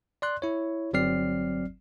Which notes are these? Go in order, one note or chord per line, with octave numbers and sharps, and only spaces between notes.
D5 C6 F#6
E4 C#5
G1 F#3 C4 D5 F6 C7